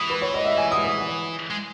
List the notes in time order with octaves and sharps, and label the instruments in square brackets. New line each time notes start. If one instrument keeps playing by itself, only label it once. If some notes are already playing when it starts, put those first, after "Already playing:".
Already playing: [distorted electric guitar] E3 [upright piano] D#6
[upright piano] B4
C#5
D#5
E5
G#5
D#6
D#6
[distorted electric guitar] G#3